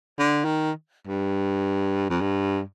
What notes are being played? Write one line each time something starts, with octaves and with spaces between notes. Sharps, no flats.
D3
D#3
G2
F2
G2